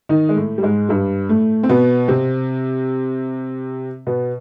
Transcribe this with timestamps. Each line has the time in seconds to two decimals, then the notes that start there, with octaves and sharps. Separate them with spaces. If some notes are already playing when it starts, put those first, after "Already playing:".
0.09 D#3 D#4
0.29 G#3
0.36 A2 A3
0.58 G3
0.62 G#2 G#3
0.89 G2 G3
1.29 A2 A3
1.63 C4
1.69 B2 B3
2.08 C3 C4
4.07 B2 B3